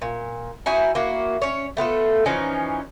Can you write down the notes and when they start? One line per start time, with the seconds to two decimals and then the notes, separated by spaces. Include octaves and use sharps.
0.02 A#2
0.66 D#4 E4 F#4 G#5
0.95 A#3 E4 F#4
1.42 C#4 C#5
1.77 A3 B3 F4 A4
2.26 E3 F3 C#4 D#4